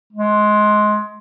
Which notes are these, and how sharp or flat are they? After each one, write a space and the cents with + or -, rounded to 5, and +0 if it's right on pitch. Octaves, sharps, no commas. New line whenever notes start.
G#3 +20